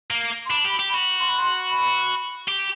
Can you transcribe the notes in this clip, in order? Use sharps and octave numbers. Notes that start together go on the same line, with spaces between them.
A#3
C6
D4 B5
G4
B5
G4
B5
F#4
C6
B5
C6
B5
G4